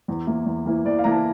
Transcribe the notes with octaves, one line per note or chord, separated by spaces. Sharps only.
E2
E3 A#3 E4
E2
E3 A#3 E4
E2 D5
F5
E3 A#3 E4 A#5
A5